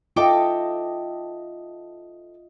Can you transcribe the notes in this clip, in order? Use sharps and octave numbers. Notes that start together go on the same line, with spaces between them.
F4 A4 D#5 E5 G5 D6